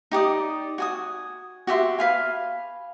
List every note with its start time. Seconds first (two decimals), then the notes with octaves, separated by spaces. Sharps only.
0.12 D#4 G4 D5 D#6
0.78 F#4 G#5 D#6
1.67 F#4 G4 E5 C6
1.99 B4 F5 G#5